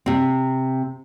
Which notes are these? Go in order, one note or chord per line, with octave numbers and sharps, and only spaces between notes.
C3 C4